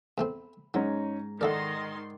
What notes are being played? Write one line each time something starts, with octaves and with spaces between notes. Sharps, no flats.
E2 A3 C4 B5
G#2 F#3 C#4 D#4 A#5
D#3 E4 A4 A#4 D5 F#5 C6